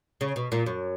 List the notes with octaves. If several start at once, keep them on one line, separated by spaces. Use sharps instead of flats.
C#3
B2
A#2
F#2